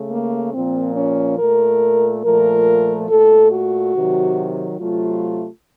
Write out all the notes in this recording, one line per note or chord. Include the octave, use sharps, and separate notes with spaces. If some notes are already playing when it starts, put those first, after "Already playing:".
Already playing: C#3 A3
A#3
A#2 F3 A#3 C4
C#4
A#2 A3 A#4
A#2 F3 A3 A#4
A#2 A3 A4
F#4
C3 D#3 F#3
C3 F#3 A3 F4